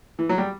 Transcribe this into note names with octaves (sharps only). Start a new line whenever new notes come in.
E3
F#3
G3